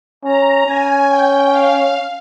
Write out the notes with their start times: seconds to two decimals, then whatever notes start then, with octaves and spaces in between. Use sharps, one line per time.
0.24 C#4 A#5
0.66 C#4 G#5
1.08 G5
1.51 F5